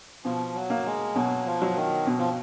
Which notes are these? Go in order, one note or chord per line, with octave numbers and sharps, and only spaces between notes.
B2 F3
F#3
A#3
G#3
B2 F#3
F3
F#3
D#3
B2
F3